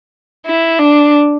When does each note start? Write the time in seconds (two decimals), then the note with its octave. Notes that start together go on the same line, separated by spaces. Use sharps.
0.46 E4
0.79 D4